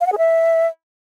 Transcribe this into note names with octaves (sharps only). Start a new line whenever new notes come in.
F5
F#5
G#4
E5